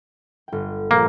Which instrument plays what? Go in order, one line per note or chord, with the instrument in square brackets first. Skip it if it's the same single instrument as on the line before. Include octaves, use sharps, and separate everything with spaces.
[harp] G1 G5
[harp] A#1 [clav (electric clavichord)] A#3